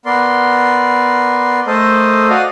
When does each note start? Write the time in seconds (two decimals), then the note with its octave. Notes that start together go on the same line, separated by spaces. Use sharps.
0.06 B3 A#4 D5 C6
1.67 A3 A4 A#4 C5 D#5
2.29 F#4 D5 D#5 F5